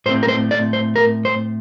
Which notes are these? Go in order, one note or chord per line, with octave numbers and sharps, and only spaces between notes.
A2 A3 C4 C5
A#4
C5
D5
C5
A#4
C5